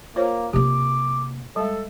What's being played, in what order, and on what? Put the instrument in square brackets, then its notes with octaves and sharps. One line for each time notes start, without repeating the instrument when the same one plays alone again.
[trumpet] A#3 [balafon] F4 C5 C#5
[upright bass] C3 A#3 [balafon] G4 [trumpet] D6
[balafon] G3 G#3 [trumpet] A4